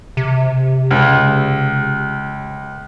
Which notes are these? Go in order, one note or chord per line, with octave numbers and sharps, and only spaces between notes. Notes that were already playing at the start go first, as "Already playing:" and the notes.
C3
C#2